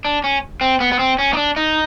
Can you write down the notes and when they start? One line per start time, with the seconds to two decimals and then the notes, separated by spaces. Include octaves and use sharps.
0.05 D4
0.24 C#4
0.61 C4
0.80 B3
0.92 B3
0.99 C4
1.19 C#4
1.33 D#4
1.37 D4
1.56 D#4